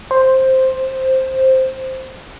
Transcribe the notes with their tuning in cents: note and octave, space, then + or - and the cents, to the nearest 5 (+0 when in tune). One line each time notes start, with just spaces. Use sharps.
C5 +5